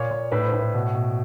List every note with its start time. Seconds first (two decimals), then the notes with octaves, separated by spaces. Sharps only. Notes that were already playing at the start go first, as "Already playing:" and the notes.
Already playing: A#2 C#5
0.11 A#2
0.32 A2 B4
0.46 C5
0.53 A2
0.59 B4
0.74 B2
0.95 B2